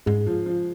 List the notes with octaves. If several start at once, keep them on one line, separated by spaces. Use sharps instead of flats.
G#2 G#3
F3
F3